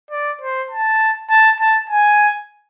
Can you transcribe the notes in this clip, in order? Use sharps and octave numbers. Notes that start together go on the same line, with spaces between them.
D5
C5
A5
A5
A5
G#5